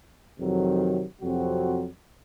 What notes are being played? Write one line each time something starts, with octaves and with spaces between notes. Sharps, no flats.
F2 C3 D#3 F#3
F2 C3 F#3 C4 F#4